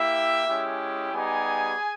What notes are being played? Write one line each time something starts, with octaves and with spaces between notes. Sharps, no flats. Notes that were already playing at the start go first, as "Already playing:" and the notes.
Already playing: A#3 E4 G4 E5
G#3 C#4 E4 G4
G3 B3 D#4 G4 G#4 G#5